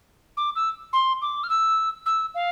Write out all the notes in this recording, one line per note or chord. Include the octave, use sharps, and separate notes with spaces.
D6
E6
C6
D6
F6
E6
E6
F5